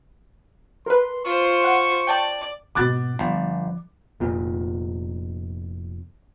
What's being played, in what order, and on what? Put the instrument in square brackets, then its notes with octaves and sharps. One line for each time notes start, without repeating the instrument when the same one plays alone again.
[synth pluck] A#4 B4 [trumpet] C6
[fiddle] F4 C5 [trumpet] C#6
[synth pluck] F#5
[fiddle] D5 [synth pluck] G5 A5
[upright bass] G#2 B2 [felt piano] D6 F#6 A6
[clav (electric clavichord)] G1 [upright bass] F3
[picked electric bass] F1 A#2